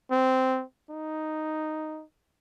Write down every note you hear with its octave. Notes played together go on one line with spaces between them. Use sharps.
C4
D#4